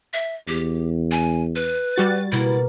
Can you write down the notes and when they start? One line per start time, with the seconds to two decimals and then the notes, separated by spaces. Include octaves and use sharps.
0.13 E5
0.48 E2 G4
1.11 G#5
1.56 B4
1.96 G3 F#4 A6
2.32 B2 A#3 E4